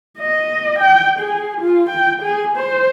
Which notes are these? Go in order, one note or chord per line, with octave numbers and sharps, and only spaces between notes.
D#5
G5
G#4
F4
G5
G#4
C5